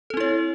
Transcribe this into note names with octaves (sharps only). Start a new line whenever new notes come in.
C4 E4 A4 C#5